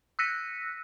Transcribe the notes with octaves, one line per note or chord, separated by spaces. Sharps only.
E6 F#6 A#6 B6 C#7 D#7